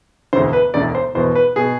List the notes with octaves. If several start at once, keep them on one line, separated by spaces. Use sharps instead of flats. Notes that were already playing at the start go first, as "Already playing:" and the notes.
E1 D2 D3 C5
B4
E1 D2 D3 D5
C5
E1 E2 B2 C5
B4
B2 G#4